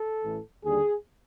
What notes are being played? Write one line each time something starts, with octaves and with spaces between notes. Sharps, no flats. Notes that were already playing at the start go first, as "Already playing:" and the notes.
Already playing: A4
A1 A2 E3
D#2 D3 G3 G#4